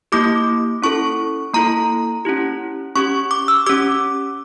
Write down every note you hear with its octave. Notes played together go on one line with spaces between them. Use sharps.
A#3 E4 G4 D6
C#4 E4 A4 C#6
A#3 E4 A4 A#5
C#4 E4 G4
C#4 G4 C#6
D6
E6
C#4 G4 D6